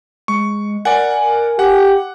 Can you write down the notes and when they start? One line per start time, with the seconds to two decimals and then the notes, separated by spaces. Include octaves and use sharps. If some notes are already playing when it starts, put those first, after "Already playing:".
0.28 G#3 C#6
0.85 A#4 D5 F#5 G#5
1.59 G4 F#5